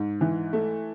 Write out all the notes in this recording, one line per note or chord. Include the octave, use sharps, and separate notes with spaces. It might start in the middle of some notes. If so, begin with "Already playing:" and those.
Already playing: G#2
E3
A3